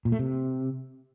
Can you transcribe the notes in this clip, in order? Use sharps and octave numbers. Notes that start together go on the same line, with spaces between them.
A#2
A3
C3